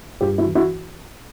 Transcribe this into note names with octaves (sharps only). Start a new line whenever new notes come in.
G2 F4 G4
E4 F#4
E3
E4 F#4